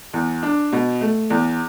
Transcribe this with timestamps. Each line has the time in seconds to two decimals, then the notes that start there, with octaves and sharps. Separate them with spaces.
0.14 E2
0.43 D4
0.72 B2
1.01 A3
1.30 E2